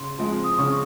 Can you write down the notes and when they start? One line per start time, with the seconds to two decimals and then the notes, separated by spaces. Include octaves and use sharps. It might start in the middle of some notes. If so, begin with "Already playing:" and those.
Already playing: C#3 C6
0.18 F3 G#3 C4
0.44 D#6
0.58 C#3 C#6